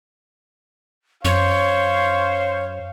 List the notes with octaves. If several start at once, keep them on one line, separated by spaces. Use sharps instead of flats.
F#2 C5 C#5 F5